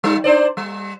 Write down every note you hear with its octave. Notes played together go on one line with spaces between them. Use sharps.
G3 D#4
D4 C5 D5
G3